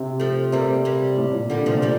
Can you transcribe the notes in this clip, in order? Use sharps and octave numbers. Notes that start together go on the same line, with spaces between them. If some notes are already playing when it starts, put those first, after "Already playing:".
Already playing: C3
F3 A3
C3 G3 A#3
G3 A#3
A2
A#2
D3 G3 A#3
C3 F3 A3
A#2
E3 G3